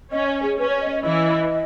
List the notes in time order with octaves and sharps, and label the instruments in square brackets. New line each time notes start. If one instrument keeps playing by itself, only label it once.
[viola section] C#4 [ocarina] D#5
[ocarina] C#5
G#4
[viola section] C#4 [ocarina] B4
[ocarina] C#5
D#5
D#5
[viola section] E3 E4 [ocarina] D#5